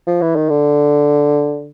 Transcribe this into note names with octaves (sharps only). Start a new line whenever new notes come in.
F3
E3
D#3
D3